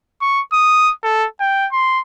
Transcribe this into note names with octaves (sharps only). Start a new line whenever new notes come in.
C#6
D#6
A4
G5
C6